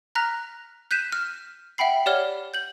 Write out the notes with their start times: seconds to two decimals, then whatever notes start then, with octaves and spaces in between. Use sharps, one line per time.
0.15 A#5 F6 F#6 A#6 B6 F7
0.91 F#6 G6 B6 D#7 E7
1.12 F6
1.78 E5 F#5 G5 B5 C7
2.06 G4 C#5 D5 F#5 F6 G7
2.54 G6 F#7